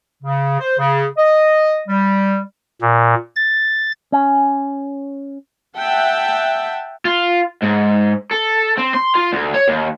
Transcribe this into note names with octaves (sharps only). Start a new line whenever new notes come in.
C#3
C5
C#3
D#5
G3
A#2
A6
C#4
E5 F#5 G5 A5
F4
G#2
A4
C4
C6
F4
D2
C#5
D#2